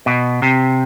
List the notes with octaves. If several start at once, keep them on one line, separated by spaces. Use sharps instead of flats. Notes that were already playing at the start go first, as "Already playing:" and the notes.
B2
C3